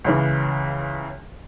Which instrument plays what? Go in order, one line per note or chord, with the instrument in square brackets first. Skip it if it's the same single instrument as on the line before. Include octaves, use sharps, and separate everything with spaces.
[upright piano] C#2 C#3 E3